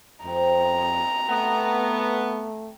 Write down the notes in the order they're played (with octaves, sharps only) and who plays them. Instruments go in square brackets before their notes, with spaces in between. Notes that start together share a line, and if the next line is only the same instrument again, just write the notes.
[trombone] F2 [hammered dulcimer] C4 A#4 C5 [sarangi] A#5
[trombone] A3 [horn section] B3